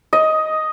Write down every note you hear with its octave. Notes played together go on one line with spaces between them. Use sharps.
D#5